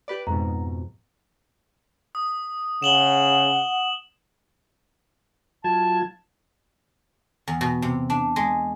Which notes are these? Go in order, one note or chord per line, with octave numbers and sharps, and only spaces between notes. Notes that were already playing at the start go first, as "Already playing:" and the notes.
G4 B4 D5
F2 G#2 B2 A#5
D#6
C#3 F#5 E7 F#7 G7
F#3 F4 A5 G#6
E2
B2
C3
D4
G#3